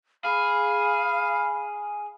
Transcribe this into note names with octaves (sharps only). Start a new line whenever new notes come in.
G#4 F5 B5